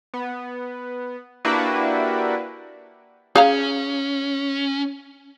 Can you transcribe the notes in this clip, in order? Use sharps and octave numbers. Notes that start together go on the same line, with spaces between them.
B3
A#3 D4 E4 F#4 G4 B4
C#4 G#4 F5 A#5